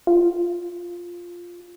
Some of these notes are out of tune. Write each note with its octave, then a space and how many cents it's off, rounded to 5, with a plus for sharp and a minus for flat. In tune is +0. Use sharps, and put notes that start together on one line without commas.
F4 +0